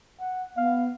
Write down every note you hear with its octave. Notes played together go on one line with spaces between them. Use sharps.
F#5
B3 F5